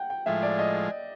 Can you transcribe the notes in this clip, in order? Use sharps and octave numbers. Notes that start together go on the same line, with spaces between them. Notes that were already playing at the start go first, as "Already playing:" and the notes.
Already playing: F#5 G5
G5
A2 F3 G#3 E5
D5
D#5